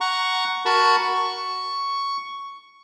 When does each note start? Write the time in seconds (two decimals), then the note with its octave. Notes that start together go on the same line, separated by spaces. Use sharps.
0.01 F#5 A#5 C#6
0.65 F#4 A#4 A5 B5 C#6
1.03 C#6